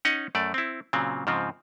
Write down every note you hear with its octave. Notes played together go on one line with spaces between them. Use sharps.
C#4 D#4 C#5 D#5 F#5
F#2 A3 D5
C4 E4
A#2 C#3 F#3 C4
G#2 C#3 F3 C4